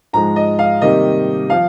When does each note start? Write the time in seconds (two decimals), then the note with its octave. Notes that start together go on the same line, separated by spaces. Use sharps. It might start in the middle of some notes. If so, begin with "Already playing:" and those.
0.13 G#2 F3 G#3 A#5
0.36 D#5
0.59 F5
0.82 C3 D#3 G3 A#3 D#5
1.50 F3 F5